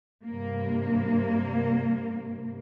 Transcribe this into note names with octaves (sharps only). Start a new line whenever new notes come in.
G2 C3 A#3